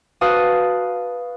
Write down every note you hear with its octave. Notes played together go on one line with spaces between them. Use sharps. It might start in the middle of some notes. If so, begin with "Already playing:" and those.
F#4 B4 F5 A5 D#6